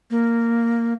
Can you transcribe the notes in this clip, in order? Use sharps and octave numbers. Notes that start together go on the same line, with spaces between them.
A#3